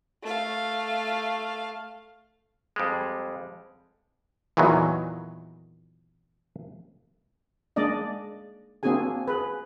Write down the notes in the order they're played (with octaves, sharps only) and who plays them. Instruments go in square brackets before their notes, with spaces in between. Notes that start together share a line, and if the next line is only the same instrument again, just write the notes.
[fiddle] A3 F5
[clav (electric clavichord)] F2 G3 G#3
E2 A#2 D#3 E3 F#3
[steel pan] G#3 A#3 D4 D5 D#5
A#3 C4 D4 F#4 G#4 G#5
G#4 B4